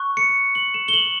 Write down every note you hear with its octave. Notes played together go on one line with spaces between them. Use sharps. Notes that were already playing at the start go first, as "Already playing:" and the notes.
Already playing: C#6 F#6
C#7
F#7
E7
G7
F#7